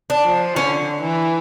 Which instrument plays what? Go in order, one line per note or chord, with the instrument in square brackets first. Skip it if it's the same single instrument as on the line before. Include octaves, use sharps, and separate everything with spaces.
[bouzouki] D4
[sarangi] F3
[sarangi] D3 [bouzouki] C#4
[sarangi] E3